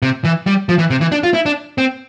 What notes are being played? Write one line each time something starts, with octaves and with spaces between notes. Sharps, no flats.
C3
E3
G3
F3
E3
C3
E3
D4
F4
E4
D4
C4